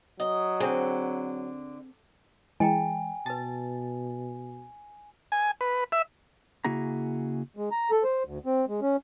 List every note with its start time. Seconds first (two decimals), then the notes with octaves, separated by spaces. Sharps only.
0.20 F#3 D#5
0.60 D3 C4 G#4
2.60 E3 G#3 D#5 G5 G#5 A#5
3.26 B2 B4 A5 A6
5.32 G#5
5.61 B4
5.92 E5
6.65 C#3 A#3 E4 F#4 G#4 A#5
7.57 G#3
7.71 A#5
7.91 A4
8.03 C5
8.25 D2
8.46 C4
8.69 G#3
8.82 C#4